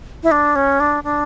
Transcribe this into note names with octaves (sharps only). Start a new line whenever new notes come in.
E4
D4
C#4
D4
D4